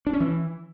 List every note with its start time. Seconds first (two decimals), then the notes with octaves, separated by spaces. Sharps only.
0.07 D4
0.13 C#4
0.20 E3